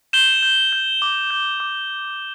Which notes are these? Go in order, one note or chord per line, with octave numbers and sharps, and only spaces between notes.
G6 E7 G7
G6
G6
D6
G6
D6